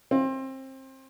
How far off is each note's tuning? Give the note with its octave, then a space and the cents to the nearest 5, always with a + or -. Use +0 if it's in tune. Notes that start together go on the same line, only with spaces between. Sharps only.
C4 +25